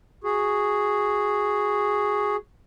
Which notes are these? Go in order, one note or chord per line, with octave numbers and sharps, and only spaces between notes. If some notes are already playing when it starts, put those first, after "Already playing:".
F#4 G#4